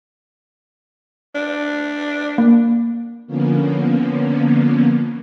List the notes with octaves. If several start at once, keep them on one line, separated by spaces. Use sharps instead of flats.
D4
A#3
D3 F3 A#3 B3 C#4